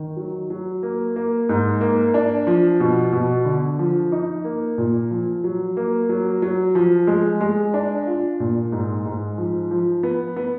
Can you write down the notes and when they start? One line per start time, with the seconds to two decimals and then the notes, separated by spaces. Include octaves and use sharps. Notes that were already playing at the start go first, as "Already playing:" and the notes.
Already playing: D#3
0.17 F#3
0.50 F#3
0.83 A#3
1.16 A#3
1.49 G#2
1.81 A#3
2.14 D4
2.47 F3
2.80 B2
3.12 B2
3.45 D3
3.79 F3
4.12 D#4
4.44 A#3
4.78 A#2
5.11 F3
5.44 F#3
5.77 A#3
6.09 F#3
6.42 F#3
6.75 F3
7.07 G#3
7.41 G#3
7.74 D4
8.07 F4
8.40 A#2
8.72 G#2
9.06 G#2
9.38 F3
9.71 F3
10.03 B3
10.36 B3